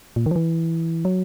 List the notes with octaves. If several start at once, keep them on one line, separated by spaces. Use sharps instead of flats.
A#2
D#3
F3
E3
F#3